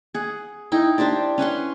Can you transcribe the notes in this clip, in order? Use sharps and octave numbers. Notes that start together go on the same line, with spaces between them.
G#4 F#5
D#4 E4 G5
D4 G4 C5 D5
C#4 B4 F#5 C6